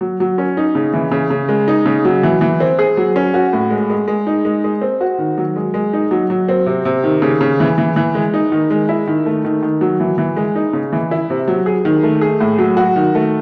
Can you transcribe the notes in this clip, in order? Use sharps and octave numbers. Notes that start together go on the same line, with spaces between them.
F#3
F#3
C#4
D#4
C#3
E3
C#3
C#3
G#3
D#4
C#3
F#3
E3
E3
C4
G#4
F#3
C#4
F#4
A2
G#3
G#3
G#3
D#4
G#3
G#3
C4
F#4
D#3
F#3
G#3
G#3
D#4
F#3
F#3
C4
C3
C3
D#3
C#3
C#3
E3
E3
E3
G#3
D#4
D#3
G#3
E4
D#3
A3
D#3
D#3
F#3
E3
E3
G#3
D#4
C#3
E3
E4
C3
F#3
G#4
D#3
A3
G#4
A2
F#3
F#4
D#3
A3